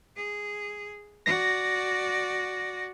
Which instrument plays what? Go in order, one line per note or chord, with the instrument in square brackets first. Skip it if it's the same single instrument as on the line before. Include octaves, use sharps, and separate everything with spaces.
[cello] G#4
[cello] F#4 D5 [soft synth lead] A#6